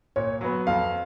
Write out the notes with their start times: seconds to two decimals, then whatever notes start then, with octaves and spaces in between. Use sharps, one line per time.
0.16 A#2 C#5
0.41 F#3 B3
0.67 F2 F5